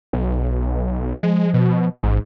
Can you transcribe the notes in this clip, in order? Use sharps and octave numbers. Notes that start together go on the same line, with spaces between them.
B1
F3 G#3
B2
A1 G#2